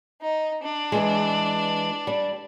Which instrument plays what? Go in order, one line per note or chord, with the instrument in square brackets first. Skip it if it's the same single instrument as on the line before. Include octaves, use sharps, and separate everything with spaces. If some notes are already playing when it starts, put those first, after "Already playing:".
[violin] D#4
D4
[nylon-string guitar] E3 G#3
G3